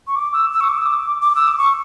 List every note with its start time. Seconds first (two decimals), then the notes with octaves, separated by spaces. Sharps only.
0.07 C#6
0.16 D6
0.33 E6
0.51 E6
0.60 C#6
0.69 D6
0.78 E6
0.86 D6
1.22 D6
1.35 E6
1.47 D6
1.58 C#6